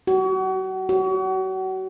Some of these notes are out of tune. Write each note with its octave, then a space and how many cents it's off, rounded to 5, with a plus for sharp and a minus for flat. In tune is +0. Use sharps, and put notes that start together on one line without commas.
F#4 +35
F#4 +35